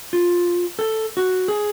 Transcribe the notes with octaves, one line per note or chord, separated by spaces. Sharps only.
F4
A4
F#4
G#4